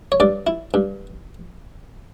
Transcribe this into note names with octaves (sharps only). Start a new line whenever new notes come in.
C#5
G2 D5
E4
G2